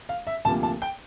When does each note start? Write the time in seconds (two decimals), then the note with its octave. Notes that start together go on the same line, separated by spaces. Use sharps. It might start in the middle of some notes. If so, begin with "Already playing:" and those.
0.09 F5
0.27 E5
0.45 D2 C3 F3 A#3 A5
0.63 A5
0.82 G5